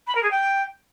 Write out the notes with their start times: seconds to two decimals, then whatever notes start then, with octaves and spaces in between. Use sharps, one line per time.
0.07 B5
0.15 A#4
0.22 G#4
0.30 G5